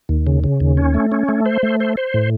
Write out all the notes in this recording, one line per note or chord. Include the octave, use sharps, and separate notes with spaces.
D#2
C#3
C#3
D#2
C#4
A3
C#4
A3
C5
A3
C5
C5
A2